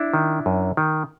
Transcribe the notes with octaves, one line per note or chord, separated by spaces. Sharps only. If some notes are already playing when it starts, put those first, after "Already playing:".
Already playing: D4 E4
D#3
F#2
D#3